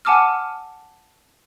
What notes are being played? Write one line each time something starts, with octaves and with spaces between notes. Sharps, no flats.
F#5 G#5 A5 D6 E6 F6